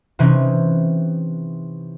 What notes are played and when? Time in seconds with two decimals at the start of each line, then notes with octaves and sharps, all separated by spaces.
0.19 C3 E3 C4 C#4 D#4